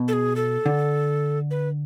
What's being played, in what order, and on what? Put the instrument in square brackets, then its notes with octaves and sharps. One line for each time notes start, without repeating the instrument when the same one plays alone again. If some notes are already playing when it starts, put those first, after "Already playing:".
Already playing: [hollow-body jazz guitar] B2
[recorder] A4
G#4
A4
[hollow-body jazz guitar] D3
[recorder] B4